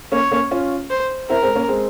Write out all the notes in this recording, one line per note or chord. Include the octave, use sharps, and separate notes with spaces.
A#3 C#4 C#5
A#3 C#4
C#4 F4
C5
C4 E4 A#4
G#3 C4
A#3 C#4
G#3 C4